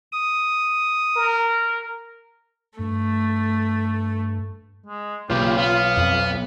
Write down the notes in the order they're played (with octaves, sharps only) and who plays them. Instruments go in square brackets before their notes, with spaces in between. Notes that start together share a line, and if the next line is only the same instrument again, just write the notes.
[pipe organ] D#6
[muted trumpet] A#4
[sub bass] G2 [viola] A3
[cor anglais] G#3
[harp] B1 [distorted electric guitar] A#2 C#3 [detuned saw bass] F4 [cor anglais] G4
[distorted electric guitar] B3 [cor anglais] F5
[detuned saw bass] F2